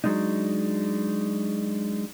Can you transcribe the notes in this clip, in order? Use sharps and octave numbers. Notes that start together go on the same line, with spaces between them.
F#3 G#3 D4 D#4